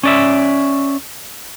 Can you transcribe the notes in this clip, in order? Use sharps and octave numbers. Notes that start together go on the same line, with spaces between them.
C#4 D5 E5